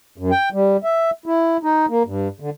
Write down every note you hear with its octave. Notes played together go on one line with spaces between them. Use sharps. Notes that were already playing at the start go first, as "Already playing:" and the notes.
F#2
G5
G3
E5
E4
D#4
A#3
G2
D3